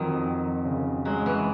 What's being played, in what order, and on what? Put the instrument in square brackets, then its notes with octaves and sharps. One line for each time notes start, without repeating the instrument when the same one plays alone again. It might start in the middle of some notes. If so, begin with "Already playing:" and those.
Already playing: [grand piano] F2 F#3 [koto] D#3
[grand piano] F2
C#3
[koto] F#3 [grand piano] G#3
[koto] E3